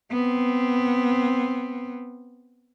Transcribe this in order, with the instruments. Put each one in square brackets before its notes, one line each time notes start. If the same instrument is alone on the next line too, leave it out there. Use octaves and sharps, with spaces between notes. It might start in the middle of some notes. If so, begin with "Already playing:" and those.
[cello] B3 C4